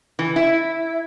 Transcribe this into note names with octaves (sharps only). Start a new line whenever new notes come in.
E3
E4